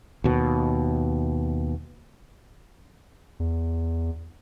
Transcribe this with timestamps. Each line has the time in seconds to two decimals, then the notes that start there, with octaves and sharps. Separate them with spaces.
0.24 D#2 B2
3.40 E2